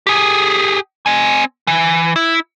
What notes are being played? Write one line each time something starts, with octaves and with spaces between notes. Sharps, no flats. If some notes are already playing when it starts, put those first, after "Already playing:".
G4 G#4
C4 G#5
E3
E4